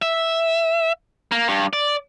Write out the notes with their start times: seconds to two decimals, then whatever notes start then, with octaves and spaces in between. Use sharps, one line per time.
0.02 E5
1.32 A#3
1.48 G2
1.73 D5